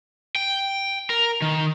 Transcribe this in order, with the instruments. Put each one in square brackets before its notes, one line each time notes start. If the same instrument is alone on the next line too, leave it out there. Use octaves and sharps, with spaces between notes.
[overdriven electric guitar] G5
A#4
D#3